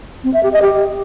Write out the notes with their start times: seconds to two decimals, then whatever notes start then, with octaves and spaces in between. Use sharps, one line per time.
0.24 C4
0.34 E5
0.43 G4
0.53 D#5
0.62 G4